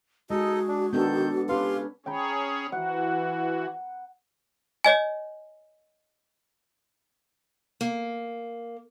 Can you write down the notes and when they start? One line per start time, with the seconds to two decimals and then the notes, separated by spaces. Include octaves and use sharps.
0.30 G#3 D#4 F#4 G#4 A4 D#5
0.68 D4
0.93 D#3 B3 D4 A4 G6
1.49 C#4 F4 G4 B4 F5 C6
2.06 C#4 G#4 C#5 G5 A#5 B5
2.72 E3 F#4 F#5
4.84 C#5 D#5 G#5
7.81 A#3